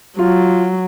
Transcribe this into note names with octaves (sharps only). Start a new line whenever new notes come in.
F#3 F4